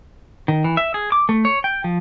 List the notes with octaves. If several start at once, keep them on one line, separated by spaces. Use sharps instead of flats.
D#3
E3
E5
G#4
D6
A3
C#5
G5
F3